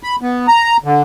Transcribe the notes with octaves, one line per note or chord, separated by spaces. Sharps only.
B5
B3
A#5
D3